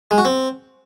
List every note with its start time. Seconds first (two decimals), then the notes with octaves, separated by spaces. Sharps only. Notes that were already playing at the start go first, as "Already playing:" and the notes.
0.11 G#3
0.18 F#4
0.25 C4